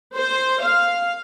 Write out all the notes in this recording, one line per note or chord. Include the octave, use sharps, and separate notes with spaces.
C5
F5